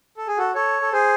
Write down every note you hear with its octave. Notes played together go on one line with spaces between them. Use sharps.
A4
G#4
F#4 A4
A4 C#5
A4
G#4 C5